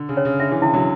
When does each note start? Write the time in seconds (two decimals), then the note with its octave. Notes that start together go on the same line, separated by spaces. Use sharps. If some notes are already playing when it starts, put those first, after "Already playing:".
Already playing: D3
0.09 C#3
0.17 C#5
0.25 C#3
0.39 D3 E5
0.51 C#3 E3
0.62 C#3 E3 E4
0.74 D3 F#3